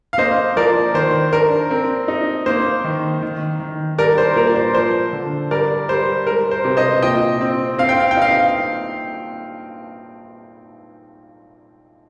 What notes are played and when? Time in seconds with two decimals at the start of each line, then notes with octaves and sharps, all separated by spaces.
0.13 F5
0.18 A#3 C5 D#5
0.56 F3 A#4 D5
0.94 D#3 C5
1.33 D4 A#4
1.71 C4
2.08 D#4
2.46 A#3 C5
2.84 D#3
3.23 D#3
3.60 D#3
3.98 G3 A#4 D5
4.18 C5
4.36 A#2 A#4
4.47 D5
4.56 C5
4.74 F3 C5
5.13 D3
5.51 G3 A#4 D5
5.89 G3 C5
6.26 G#3 A#4
6.51 C5
6.65 C3
6.77 C5 D#5
7.02 A#2 D#5 G5
7.41 C4
7.78 C4 F5
7.89 G5
8.00 F5
8.11 G5
8.17 D#4 F5